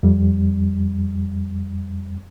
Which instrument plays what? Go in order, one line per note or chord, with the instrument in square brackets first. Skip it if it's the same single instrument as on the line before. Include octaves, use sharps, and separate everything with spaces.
[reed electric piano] F2 G3